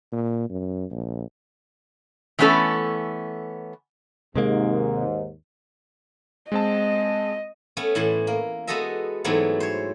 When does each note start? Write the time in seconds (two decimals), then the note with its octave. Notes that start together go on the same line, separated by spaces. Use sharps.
0.12 A#2
0.50 F#2
0.91 A#1
2.39 E3 A3 B3 C#4 A4
4.35 D#2 G#2 C3 G#3 A#3
6.52 G#3 C4 D#5 A5
7.77 A3 B3 C#4
7.95 A2 E3 F#5 C6
8.27 A#3
8.67 G#3 B3 F#4 A4 D#5 E5
9.24 G#2 E3 F#3 A3 B3 C4
9.60 C5 C#5